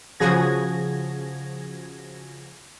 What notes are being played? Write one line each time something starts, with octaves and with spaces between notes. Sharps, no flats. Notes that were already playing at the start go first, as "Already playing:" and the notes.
C#3 F3 F#4 G#4 G#6 A#6